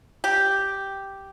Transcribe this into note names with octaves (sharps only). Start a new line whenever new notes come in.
G4